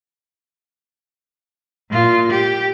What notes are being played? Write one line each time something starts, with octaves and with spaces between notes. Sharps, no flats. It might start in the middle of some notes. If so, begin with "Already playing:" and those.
A#2 F4
G4